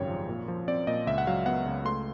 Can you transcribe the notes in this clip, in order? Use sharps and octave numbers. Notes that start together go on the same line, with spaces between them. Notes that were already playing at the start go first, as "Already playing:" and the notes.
Already playing: G#1 F#2 C#3 G3 C#5 G5
F3
A#2
F3
C4 D5
A#2 D#5
C#2 E5
F#5
F#3 F5
B3 F#5
C#2
A3 C6